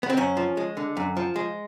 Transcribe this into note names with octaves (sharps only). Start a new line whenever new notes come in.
B3
C4
F#2 C#4
F3
G#3
D3
F#2
F3
G#3